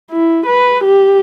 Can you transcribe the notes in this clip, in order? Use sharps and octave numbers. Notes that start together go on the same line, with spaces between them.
E4
B4
G4